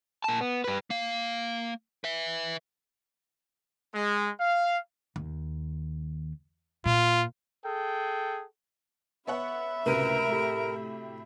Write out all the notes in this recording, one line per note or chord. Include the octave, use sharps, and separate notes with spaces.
A#2 A5
B3
G2 B4
A#3 F5
B4 E5
G#3
F5
D#2
A#2 F4
G#4 A4 G5
B3 C#5 E5 F#5 B5
C#2 A2 C3 F#3 A#4 B4 D#7
A3 G4